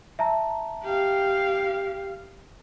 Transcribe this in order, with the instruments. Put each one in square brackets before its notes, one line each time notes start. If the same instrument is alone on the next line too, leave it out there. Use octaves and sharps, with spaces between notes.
[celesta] E5 A5 A#5
[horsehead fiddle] G4 F5